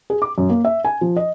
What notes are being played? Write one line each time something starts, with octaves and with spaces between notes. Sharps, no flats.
G#4
D6
F#2
A#3
E5
G#5
F3
D#5